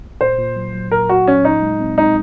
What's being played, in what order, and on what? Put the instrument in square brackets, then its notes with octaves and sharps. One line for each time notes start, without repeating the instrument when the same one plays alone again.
[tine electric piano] A#2 [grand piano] C5
[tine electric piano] A#2
F#3
F#3
[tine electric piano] A#2 [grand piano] A#4
[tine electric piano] A#2 [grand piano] F#4
[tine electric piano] F#3 [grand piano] C#4
[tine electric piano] A#2 [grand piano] D#4
[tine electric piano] G#3
C4
[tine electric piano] G#3 [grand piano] D#4